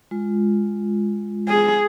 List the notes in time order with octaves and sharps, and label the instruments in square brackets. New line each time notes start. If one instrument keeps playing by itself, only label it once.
[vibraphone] G#3 F4
[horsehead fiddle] G#4